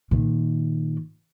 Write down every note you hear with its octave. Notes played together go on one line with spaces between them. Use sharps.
A#2 D#3